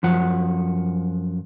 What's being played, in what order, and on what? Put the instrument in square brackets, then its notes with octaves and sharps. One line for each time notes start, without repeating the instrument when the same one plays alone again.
[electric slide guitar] F#2 F3 F#5